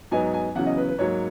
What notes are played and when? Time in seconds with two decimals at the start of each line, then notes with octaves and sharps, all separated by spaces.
0.11 G#2 F#3 B3 D#4 G#5
0.33 G#5
0.55 E2 C#3 F#3 C#4 F#5
0.66 D#5
0.77 B4
0.88 B4
0.98 G#2 F#3 A#3 C#5